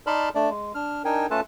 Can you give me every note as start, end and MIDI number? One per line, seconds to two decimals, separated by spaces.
0.07 0.29 63
0.07 0.29 74
0.07 0.29 81
0.07 0.29 83
0.07 0.29 84
0.07 0.29 89
0.35 0.50 57
0.35 0.50 62
0.35 0.50 74
0.50 0.72 56
0.75 1.02 62
0.75 1.02 89
1.05 1.27 62
1.05 1.27 63
1.05 1.27 70
1.05 1.27 79
1.05 1.27 80
1.31 1.41 57
1.31 1.41 61
1.31 1.41 65
1.31 1.41 69
1.31 1.41 71
1.31 1.41 81